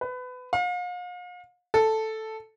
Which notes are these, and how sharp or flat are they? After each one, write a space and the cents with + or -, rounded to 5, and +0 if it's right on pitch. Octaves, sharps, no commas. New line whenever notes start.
B4 +25
F5 +40
A4 +0